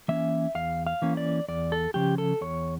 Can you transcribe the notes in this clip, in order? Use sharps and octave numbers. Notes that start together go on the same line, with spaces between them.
E3 A#3 C#4 E5
E2 F5
F5
E3 A#3 C#4
D5
E2 D5
A4
C#3 F3 C#4 G4
A4
E2 C#5